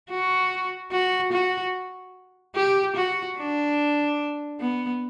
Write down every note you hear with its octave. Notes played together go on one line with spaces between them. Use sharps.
F#4
F#4
F#4
G4
F#4
D4
B3